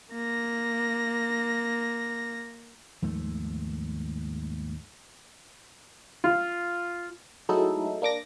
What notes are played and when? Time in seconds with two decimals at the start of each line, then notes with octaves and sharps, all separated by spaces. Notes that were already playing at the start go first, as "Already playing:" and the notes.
0.12 A#3 A#6
3.02 D#2 G#2 F3 A3
6.24 F4
7.49 F#3 G#3 A3 D#4 E4 A4
8.02 A#3 D4 D6 A#6